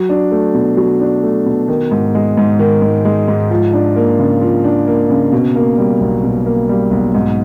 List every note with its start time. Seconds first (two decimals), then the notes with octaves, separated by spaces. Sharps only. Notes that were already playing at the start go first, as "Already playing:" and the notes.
Already playing: F#3
0.09 D4
0.32 A3
0.54 B2
0.77 F#3
1.00 D4
1.24 A3
1.46 B2
1.68 D#3
1.91 G#2
2.15 G#3
2.37 G#2
2.59 D#3
2.82 G#2
3.05 G#3
3.28 G#2
3.51 F3
3.73 D4
3.96 A#3
4.19 C#3
4.41 F3
4.64 D4
4.88 A#3
5.10 C#3
5.32 B2
5.56 A#3
5.78 G3
6.01 B1
6.24 B2
6.46 A#3
6.69 G3
6.91 B1
7.14 G#2